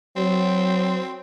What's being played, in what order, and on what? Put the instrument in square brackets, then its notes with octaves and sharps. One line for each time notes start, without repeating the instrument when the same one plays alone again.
[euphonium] F#3 [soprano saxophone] C4